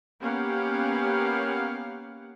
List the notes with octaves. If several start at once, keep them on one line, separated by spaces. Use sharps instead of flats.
A#3 B3 C#4 G4 F5 F#5